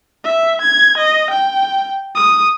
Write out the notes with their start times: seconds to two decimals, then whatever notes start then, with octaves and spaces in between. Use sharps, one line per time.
0.25 E5
0.62 G#6
0.98 D#5
1.31 G5
2.16 D#6